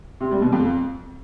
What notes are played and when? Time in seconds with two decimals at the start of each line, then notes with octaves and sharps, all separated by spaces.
0.21 C3
0.31 G3
0.42 B2
0.52 F2